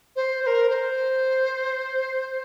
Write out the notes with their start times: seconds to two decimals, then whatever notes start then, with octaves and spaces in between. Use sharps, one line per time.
0.16 C5
0.42 C5
0.46 A#4
0.69 C5